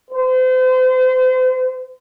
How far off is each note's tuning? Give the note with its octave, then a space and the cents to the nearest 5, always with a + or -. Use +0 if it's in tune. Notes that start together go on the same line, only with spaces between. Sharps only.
C5 -35